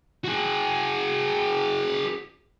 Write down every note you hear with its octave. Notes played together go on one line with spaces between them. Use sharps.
F#4 G#4